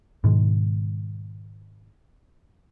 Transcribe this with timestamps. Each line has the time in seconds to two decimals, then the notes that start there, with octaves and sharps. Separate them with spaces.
0.24 G#2 B2 D#3 G#3